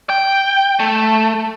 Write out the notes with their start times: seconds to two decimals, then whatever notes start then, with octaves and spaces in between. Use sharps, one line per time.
0.10 G5
0.80 A3